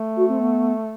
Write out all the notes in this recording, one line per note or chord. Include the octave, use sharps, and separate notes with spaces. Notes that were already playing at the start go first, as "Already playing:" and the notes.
Already playing: A3
F#4
C4
B3